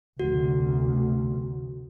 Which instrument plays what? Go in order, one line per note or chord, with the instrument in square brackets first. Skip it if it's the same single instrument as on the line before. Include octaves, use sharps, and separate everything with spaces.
[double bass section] F1 D2 B2 [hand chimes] F#4